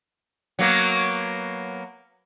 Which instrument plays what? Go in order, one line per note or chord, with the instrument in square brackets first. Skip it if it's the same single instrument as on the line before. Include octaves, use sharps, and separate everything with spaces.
[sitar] F#3 A#3 B3